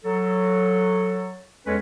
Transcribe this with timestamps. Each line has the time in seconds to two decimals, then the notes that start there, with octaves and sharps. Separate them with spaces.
0.05 F#3 A4
1.66 E2 G#3 C#4 A4 B4 C#5